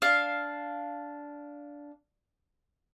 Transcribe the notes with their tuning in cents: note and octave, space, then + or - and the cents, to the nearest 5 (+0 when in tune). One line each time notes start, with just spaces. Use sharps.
D4 -10 F5 +0